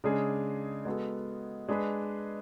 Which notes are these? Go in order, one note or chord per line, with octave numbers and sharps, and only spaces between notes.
C#3 G#3 D4 G#4
G#3 B3 F#4 A4
G#3 D4 G#4 B4